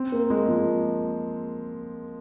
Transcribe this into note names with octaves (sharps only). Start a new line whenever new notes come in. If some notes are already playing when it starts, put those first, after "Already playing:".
Already playing: C4
A#3
G#3
F3